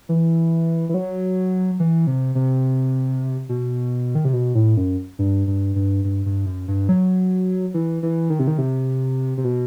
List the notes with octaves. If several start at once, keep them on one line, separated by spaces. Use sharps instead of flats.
E3
E3
F#3
E3
C3
C3
B2
D#3
C3
B2
A2
F#2
G2
G2
G2
G2
G2
F#2
G2
F#3
E3
E3
D#3
C3
D#3
C3
C3
B2